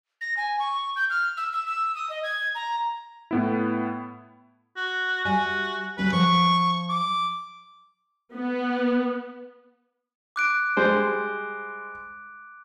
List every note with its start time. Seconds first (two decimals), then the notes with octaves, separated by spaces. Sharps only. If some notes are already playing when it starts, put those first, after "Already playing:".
0.21 A#6
0.37 G#5
0.59 C#6
0.96 G6
1.10 F6
1.37 E6
1.53 E6
1.66 E6
1.95 D#6
2.09 D#5
2.23 G#6
2.55 A#5
3.31 A2 B3 E4
4.76 F#4
5.25 G3 F#4 E5 G#5
5.98 D2 G3 C#4 B4
6.12 F3 C#6
6.89 D6
8.35 B3
10.36 D6 F#6 D7
10.77 G3 G#3 C5